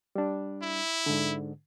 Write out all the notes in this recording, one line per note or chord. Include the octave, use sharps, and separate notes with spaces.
G3 D4
E4
G#2 D3